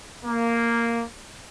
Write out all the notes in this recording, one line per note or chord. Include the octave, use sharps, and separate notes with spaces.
A#3